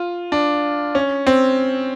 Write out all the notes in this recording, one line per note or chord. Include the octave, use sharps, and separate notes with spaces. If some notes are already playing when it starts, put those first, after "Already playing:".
Already playing: F4
D4
C#4
C4